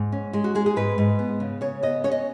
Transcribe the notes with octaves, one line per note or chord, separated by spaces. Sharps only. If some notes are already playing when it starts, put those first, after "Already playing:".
Already playing: G#2
C#4
G#3 G#4
F#4
G#3 G#4
G#4
G#2 B4
G#2
B3
C#3
C#3 C#5
B3 D#5
C#4 C#5
D#5